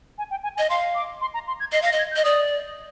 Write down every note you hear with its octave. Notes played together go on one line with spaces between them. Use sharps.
G#5
G5
G#5
D#5 G#5
F5 C6
D6
C6
A#5
C6
G#6
D#5 C7
F5 A#6
D#5
G#6
G6
D#5
D5 D#6